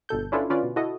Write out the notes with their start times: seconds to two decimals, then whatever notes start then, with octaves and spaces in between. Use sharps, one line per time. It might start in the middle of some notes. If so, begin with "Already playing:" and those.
0.09 G1 B2 A4 G6
0.32 C#4 D4 E4 F4 A4 B4
0.50 D3 C#4 F4 B4 D5
0.63 B2
0.76 E4 F#4 A4 D#5